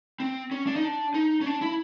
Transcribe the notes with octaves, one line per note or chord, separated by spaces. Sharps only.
C4
C#4
D4
D#4
D4
D#4
C#4
D4
E4